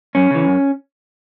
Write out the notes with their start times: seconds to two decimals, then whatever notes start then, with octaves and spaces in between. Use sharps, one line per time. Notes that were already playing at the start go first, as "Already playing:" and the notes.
0.15 F#2 C#4
0.31 C#3 E3
0.46 F#2